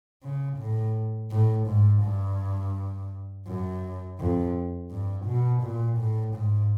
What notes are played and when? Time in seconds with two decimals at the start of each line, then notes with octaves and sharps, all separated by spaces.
0.23 C#3
0.58 A2
1.30 A2
1.67 G#2
2.03 G2
3.46 F#2
4.19 F2
4.91 G2
5.26 B2
5.63 A#2
5.98 A2
6.35 G#2